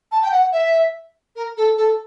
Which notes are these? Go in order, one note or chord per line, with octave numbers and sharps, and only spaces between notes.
A5
G5
F#5
E5
A#4
A4
A4